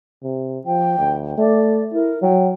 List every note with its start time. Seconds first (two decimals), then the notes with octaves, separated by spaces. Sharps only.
0.23 C3
0.66 F3 G5
0.98 D2
1.38 A3 D5
1.93 E4 A#4
2.22 F#3 G5